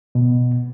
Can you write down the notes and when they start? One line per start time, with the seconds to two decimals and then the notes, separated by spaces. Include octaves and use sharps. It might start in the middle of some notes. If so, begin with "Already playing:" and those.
0.15 B2